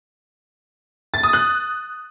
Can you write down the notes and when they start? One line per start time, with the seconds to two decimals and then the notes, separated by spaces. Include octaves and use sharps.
1.14 A6
1.23 D#6
1.33 F#6